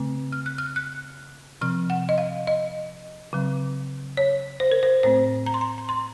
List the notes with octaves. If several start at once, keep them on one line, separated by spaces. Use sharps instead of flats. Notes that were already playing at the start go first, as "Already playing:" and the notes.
Already playing: C#3 A3 C4
F6
F#6
F6
F#6
C3 F3 C4 F6
F#5
D#5
F5
D#5
C#3 F#3 C4
C#5
C5
A#4
C5
A2 A3 C4 C5
A#5
C6
A#5
A#5
C6